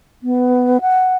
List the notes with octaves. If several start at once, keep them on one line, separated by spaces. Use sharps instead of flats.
B3
F#5